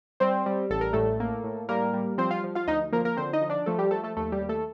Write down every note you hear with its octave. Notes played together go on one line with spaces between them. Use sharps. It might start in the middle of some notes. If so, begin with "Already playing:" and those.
G3 C4 C5
G3
A1 A4
A#4
A2 A3 A4
A#3
A2
G3 A#3 A#4
G3
F3 C4 C5
F4 F5
F3
F4 F5
D2 D#4 D#5
F3 A#3 A#4
A#3 A#4
D3 C4 C5
D#4 D#5
F3
D4 D5
F3 A3 A4
G3 G4
F3 A3 A4
A3 A4
D#2 A3 A4
G3 G4
D#2
A3 A4